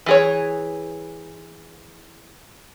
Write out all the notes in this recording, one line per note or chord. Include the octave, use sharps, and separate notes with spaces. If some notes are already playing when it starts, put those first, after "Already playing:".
E3 G#4 C#5